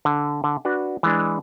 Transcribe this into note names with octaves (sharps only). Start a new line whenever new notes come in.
D3
D3
D4 F#4 B4
E3 G#3 D4